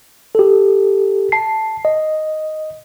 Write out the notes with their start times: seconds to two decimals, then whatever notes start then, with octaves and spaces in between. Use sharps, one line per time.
0.35 G4 A4
1.32 A5 C7
1.85 D#5